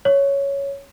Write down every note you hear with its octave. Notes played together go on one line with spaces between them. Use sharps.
C#5